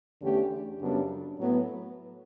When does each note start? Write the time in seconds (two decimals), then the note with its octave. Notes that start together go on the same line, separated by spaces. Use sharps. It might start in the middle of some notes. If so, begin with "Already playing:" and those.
0.21 E2 D3 A3 C#4 G4
0.80 F#2 C#3 G3 B3 D4
1.38 A2 F#3 B3